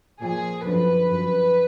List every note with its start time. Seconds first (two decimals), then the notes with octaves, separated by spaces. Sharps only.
0.21 A#2 F3 G#4
0.63 F#2 D3 F3 B4
1.05 F#2 F3